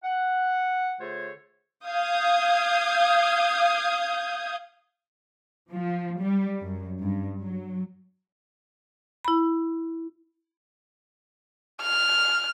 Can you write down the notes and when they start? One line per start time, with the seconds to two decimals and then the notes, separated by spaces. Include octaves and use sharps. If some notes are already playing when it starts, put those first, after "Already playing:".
0.04 F#5
1.01 D3 A3 F4 G#4 C5 C#5
1.87 F5 D#6 G6 G#6
5.71 F3
6.21 G3
6.63 F#2
7.02 G2
7.42 F#3
9.25 E4 B5
11.82 F6